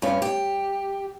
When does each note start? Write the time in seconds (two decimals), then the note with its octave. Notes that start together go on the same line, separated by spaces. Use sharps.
0.02 G2 C#4
0.22 G4